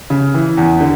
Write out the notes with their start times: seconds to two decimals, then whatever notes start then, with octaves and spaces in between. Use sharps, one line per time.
0.10 C#3
0.34 E3
0.57 E2
0.81 D3